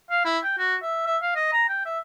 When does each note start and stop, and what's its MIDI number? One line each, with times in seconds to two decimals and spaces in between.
0.11 0.24 77
0.25 0.39 64
0.44 0.55 79
0.58 0.76 66
0.82 1.05 76
1.07 1.17 76
1.23 1.33 77
1.36 1.52 75
1.53 1.66 82
1.69 1.81 79
1.85 1.98 76